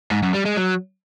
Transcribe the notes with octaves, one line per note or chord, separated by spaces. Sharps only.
G#2
F#2
G3
G#3
F#3